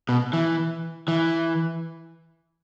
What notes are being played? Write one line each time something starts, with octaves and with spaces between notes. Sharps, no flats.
B2
E3
E3